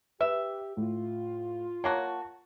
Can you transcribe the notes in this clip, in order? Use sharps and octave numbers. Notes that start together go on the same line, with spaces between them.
G4 B4 E5
A2 F4
F#3 A#3 F#4 C#5 A5